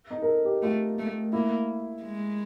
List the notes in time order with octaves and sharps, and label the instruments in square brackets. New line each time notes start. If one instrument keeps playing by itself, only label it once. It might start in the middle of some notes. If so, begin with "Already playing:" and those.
[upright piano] D#4
A#4
A4
G4
[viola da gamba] A3 [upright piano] F4
[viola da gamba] A3
[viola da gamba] A#3 [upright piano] E4
[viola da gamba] G#3